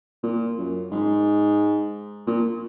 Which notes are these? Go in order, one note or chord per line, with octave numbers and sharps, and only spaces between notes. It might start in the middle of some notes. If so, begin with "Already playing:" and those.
A#2
F#2
G#2
A#2